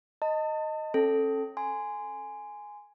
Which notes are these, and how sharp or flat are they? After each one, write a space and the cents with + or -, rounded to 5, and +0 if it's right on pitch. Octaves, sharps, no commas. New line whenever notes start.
D#5 +0 A5 +35
C#4 -35 A4 +0
G#5 +0 C6 -20